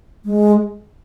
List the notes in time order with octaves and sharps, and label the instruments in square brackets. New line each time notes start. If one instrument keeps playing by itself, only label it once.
[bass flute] G#3